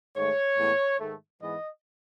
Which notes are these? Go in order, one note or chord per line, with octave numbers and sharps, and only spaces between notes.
G#2 D#3 A3 C#5
A2 E3 G#3 B3
G#2 D#3 A3
G#2 E3 G#3 B3 D#5